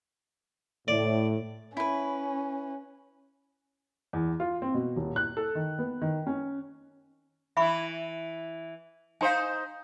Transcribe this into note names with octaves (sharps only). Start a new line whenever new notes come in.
A2 D5
C#4 E4 B4
E2
F4
C4
B2
D#1
F#6
A4
D#3
B3
D#3
C#4
E3 E4 E5 B5 C#6
D#4 C5 F5 G#5